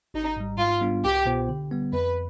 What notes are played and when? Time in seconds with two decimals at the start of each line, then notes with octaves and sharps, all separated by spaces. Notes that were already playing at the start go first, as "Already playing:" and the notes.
0.14 G#1 D#4
0.37 G#2 G3
0.58 G#2 F4
0.81 G3 B3 D4 F4
1.04 C2 G4
1.26 B2 B3 F4 C5
1.49 D3
1.71 G3 B3
1.93 F2 B4